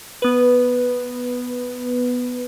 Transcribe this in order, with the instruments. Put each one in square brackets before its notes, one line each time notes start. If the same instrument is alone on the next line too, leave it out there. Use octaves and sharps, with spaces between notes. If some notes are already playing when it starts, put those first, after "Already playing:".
[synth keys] B3 B4